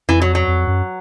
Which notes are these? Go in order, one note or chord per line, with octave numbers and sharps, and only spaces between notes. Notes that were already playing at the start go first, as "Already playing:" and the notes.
F2 E3
F#3
F#3
F2
F#2